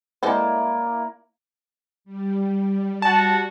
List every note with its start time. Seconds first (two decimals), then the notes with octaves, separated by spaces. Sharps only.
0.23 G#3 A#3 E4 A4 C5 D5
2.04 G3
3.02 F#4 A5